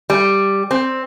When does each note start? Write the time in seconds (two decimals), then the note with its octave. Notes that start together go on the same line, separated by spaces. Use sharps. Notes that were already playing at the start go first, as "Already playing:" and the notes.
0.10 G3
0.71 C4